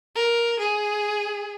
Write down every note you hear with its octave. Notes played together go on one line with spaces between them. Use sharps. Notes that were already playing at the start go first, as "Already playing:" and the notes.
A#4
G#4